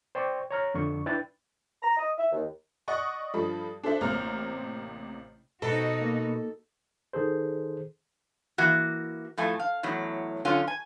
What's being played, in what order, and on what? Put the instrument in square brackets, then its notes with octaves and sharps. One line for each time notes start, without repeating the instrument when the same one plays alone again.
[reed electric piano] C5 D5 G5 C6 C#6
C#5 A#5 F6
F2 D3 C#6
D4 E4 B4 G5 B5 A6
[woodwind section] A#5
D#5
E5
D#2
[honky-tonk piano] D5 D#5 F#5 C#6 D#6
G2 F3 A4 B5
D4 A4 C5 E5
A1 C3 A#3 C5 A#5 F6
[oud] B2 [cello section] D#4 F#4 [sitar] A4
[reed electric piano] A#3
[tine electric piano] D#3 G#4 A4 C5
[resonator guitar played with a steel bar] E3 A#3 F#4
A2 F3 A3 G#5
F5
E2 A2 F#3
F#2 D3 C#4 F4
G#5